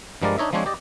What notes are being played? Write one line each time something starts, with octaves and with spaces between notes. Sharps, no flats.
G2 F3 G3 G#3 A#4 D5
D4 D#4 C#5 D#5 E5
F3 G#3 C4 D4 C#5
G4 D5 D#5